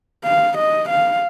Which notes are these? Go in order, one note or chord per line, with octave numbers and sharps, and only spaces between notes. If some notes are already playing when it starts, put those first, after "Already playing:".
F5
D#5
F5